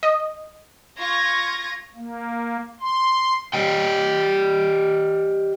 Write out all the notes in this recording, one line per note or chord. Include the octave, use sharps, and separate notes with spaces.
D#5
F4 C#6 G#6 A#6
A#3
C6
G4 D5 D#5 G5